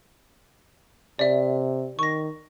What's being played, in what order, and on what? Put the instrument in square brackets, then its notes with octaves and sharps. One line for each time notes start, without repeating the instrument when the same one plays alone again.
[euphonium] C3 [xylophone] D5 E5
[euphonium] D#3 [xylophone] C#6 A#6